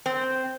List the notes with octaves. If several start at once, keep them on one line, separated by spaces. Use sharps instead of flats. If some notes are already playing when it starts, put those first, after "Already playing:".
C4